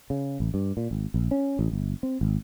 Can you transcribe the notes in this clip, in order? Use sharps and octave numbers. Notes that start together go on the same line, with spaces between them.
C#3
A1
G2
A#2
G#1
A#1
C#4
A1
G1
C4
G#1